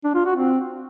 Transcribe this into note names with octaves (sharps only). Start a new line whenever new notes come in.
D4
F4
F#4
C4